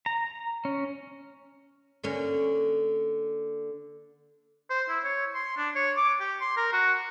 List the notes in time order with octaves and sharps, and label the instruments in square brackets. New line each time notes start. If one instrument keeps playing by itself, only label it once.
[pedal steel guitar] A#5
C#4
[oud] D3 A#3 C#4
[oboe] C5
E4
C#5
C6
D4
C#5
D6
G4
C6
A#4
F#4